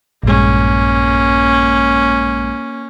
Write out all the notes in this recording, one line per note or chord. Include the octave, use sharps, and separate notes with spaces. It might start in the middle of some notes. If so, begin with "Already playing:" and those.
A#1 G2 G#3 A#3 C#4